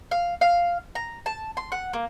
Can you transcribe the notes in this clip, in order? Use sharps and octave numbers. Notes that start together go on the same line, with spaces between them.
F5
F5
A#5
A5
C6
F#5
A#3